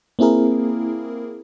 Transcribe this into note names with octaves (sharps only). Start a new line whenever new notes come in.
A#3 C4 E4 G#4 A#4